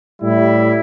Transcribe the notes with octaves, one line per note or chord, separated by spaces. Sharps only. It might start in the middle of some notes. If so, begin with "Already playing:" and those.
A2 G3 E4